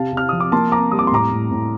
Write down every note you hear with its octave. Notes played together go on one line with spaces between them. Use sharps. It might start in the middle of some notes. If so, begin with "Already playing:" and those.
Already playing: C3 F5 A5
C3 F6
F3 D#6
D6
A#3 A5 C6
A#3 A#5 D6
G3 D#6
D6
C6
A2 A#5 D6
A2
A2